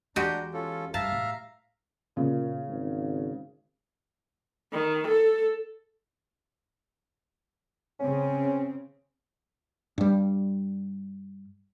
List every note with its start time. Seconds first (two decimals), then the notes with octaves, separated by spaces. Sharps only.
0.16 E2 G#3 D4 F#4 G4 A#5 G6
0.53 C#4 F4 A4
0.94 G2 E5 F5 A5 A#5
1.12 A2
2.17 A#2 C#3
2.68 G#1
4.73 D#3
5.08 A4
8.00 C#3 C4 C#4
9.98 G2 G3